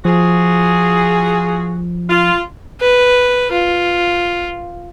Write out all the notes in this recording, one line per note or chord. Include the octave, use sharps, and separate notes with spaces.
F3 F4 F#4 G#4
F4
B4
F4